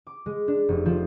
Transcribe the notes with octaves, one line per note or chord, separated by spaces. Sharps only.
D6
G#3
D4
F1
F3